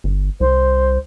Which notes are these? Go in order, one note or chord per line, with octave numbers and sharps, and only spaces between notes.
G1
C2 C5